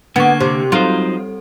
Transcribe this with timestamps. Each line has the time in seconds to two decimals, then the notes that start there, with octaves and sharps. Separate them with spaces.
0.16 D3 A#3 B3 C#6 G#6
0.41 C3 C5
0.72 F#3 G3 C4 D#4 F4 A4 C5